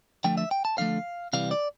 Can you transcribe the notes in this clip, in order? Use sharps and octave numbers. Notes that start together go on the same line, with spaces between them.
D3 F3 A3 G5
E5
G5
A5
D3 F3 A3 F5
C3 E3 G3 F5
D5